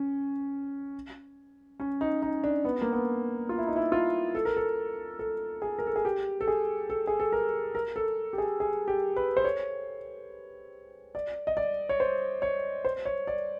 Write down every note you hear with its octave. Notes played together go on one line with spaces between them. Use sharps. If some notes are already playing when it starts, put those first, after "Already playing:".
Already playing: C#4
C#4
D#4
D#4
D4
B3
A#3
B3
F4
E4
D#4
E4
F4
A4
A#4
A4
A4
G#4
A#4
A4
G#4
G4
A4
G#4
A4
G#4
A4
A#4
A#4
A4
G4
G#4
G#4
G4
B4
C5
C#5
D5
D#5
D5
C#5
C5
C#5
C5
C#5
D5